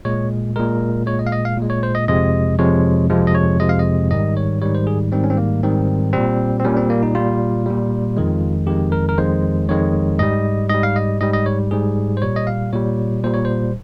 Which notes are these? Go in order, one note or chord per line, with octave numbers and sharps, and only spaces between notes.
A#2 G#3 C#5
A#2 G#3 A#4
A#2 G#3 C#5
D#5
F5
D#5
F5
A#2 G#3
C#5
C5
D#5
F2 C3 F3 G#3 D#5
F2 C3 F3 G#3 C#5
F2 C3 F3 G#3
D#5
C#5
F2 C3 F3 G#3 D#5
F5
D#5
G#2 D#3 G3 D#5
C#5
G#2 D#3 G3 C#5
C5
G#4
G#2 D#3 G3 C4
C#4
C4
A#3
G#2 D#3 G3 C4
A#2 G3 C4
C4
A#2 G3 C#4
C4
A#3
D#4
A#2 G3 F4
A#2 G3
F2 D#3 G#3
F2 D#3 G#3 G4
A#4
A#4
F2 D#3 G#3 C5
F2 D#3 G#3 C#5
G#2 G3 D#5
G#2 G3 D#5
F5
D#5
G#2 G3 D#5
D#5
C#5
G#2 G3 G#4
C5
A#2 G3 C#5
D#5
F5
A#2 G3 C#5
A#2 G3 C5
C#5
C5